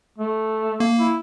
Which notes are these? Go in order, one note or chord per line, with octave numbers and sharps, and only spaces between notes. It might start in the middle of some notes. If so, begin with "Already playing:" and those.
A3
A#3
E4